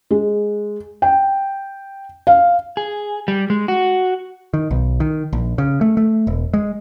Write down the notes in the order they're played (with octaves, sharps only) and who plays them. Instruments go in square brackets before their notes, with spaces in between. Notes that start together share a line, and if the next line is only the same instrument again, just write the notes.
[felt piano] G#3
G5
F5
[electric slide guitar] G#4
G3
G#3
F#4
[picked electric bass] D#3
B1
D#3
A#1
C#3
A3
A3
E1
G#3